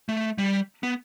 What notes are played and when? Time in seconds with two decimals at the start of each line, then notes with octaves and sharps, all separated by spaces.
0.09 A3
0.38 G3
0.83 B3